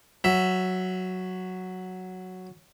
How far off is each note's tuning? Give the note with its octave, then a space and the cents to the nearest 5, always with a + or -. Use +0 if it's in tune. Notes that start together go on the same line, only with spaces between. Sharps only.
F#3 +0 E5 +0